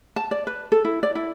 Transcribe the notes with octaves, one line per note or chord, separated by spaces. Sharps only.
A5
D5
B4
A4
E4
D5
E4